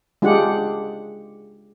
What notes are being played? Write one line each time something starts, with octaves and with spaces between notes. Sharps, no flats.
G#3 D4 F4 G4 F#5